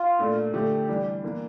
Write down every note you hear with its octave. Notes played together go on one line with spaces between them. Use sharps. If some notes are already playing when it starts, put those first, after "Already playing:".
Already playing: F4
A#2 A3 D4
D3 F3 A3 G4
E3 G3 D4
E3 A#3 D4